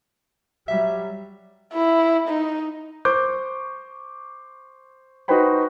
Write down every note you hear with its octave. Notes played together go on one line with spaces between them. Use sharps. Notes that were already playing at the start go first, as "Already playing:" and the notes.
F#3 G3 E5
E4
D#4
C5 C#6 D6 G6
D#4 F#4 B4 C5 G5 B5